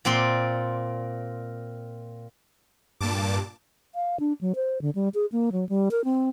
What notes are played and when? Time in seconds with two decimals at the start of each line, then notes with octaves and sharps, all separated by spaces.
0.05 A#2 C4 D5 C6
3.01 G2 A#2 A5 D6
3.95 F5
4.20 D4
4.41 F#3
4.55 C5
4.81 D3
4.95 G3
5.14 G#4
5.32 A#3
5.52 F#3
5.69 G3
5.91 A#4
6.04 C4